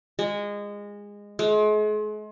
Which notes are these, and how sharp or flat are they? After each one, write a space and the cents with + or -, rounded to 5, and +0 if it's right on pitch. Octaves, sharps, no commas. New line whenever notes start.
G#3 -20
G#3 +40